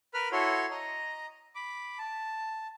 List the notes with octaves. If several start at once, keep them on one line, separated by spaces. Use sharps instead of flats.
A#4 B4 B5 F6
E4 F#4 A4 C#5 C6
D#5 A#5
B5 D6
A5